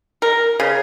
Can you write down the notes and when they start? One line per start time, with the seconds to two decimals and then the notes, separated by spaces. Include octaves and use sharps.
0.22 A#4
0.60 C#3